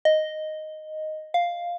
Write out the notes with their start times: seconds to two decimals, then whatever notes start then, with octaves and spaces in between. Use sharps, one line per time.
0.05 D#5
1.34 F5